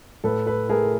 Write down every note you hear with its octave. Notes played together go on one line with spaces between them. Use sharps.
A2 A4 B4
A4 B4
A3 G#4 A#4